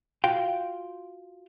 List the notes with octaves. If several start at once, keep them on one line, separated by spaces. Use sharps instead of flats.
F4 F#4 F5 G5